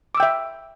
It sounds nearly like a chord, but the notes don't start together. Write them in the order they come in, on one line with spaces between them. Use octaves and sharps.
D6 E6 G5 E5